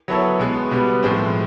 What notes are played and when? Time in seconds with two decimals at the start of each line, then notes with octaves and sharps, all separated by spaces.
0.08 F#3 B3 E4 A4 C#5
0.39 B2 G#3 B3
0.71 B2 G3 B3
1.03 A2 F3 G#3 C4